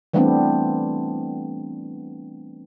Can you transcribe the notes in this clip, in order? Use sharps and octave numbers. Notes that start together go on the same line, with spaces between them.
E3 G3 A3 B3 C4 D4